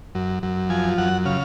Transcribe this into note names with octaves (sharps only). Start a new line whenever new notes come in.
F#2
F#2
F3 G#5
F#2 F#5
C#3 F5